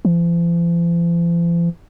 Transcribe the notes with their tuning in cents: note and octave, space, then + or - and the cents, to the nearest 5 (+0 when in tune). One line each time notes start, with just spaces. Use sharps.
F3 -45